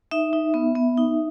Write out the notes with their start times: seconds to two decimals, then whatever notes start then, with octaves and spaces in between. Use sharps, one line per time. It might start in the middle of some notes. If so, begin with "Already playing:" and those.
0.11 D#4 E5
0.33 D#4
0.54 B3
0.76 B3
0.97 D#4